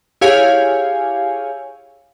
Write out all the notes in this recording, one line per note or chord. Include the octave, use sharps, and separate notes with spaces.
E4 G4 G#4 C#5 F5 G#5